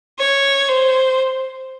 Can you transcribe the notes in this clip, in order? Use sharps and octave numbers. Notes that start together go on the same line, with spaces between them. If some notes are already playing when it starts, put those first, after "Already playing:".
C#5
C5